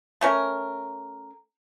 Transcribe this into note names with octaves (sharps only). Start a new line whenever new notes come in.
A3 C#4 A#4